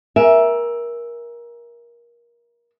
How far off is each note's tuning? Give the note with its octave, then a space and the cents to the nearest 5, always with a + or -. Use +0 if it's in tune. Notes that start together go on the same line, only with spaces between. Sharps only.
A#4 +20 E5 +0 G#5 +0